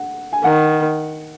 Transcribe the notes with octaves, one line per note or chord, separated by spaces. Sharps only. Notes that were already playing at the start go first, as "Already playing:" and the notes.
Already playing: F#5
G#5
D#3 F#5